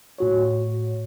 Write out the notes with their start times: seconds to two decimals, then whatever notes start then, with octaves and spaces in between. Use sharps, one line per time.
0.18 A2 F#4 C#5